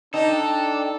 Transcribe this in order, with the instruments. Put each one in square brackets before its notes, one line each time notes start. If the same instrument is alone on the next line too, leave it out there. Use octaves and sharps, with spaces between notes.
[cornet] D4 [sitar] D#4 [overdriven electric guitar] A4 [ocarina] G5